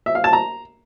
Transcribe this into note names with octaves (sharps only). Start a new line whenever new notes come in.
E5
F5
A5
A#5